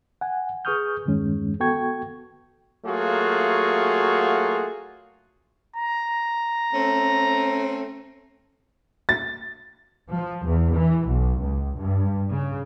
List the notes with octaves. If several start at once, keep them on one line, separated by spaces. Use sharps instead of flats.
F#5 G#5
G#4 B4 C#6 D#6 F6 G6
E2 G2 D#3 G#3 C#4
B3 F#4 A4 G5 C#6 G#6
F#3 A3 A#3 F4 F#4 G#4
A#5
A3 C4 C#4
A6
F3
E2
E3
B1
C#2
G2
C#3